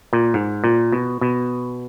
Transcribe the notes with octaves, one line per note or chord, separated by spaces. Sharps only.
A#2
G#2
A#2
B2
B2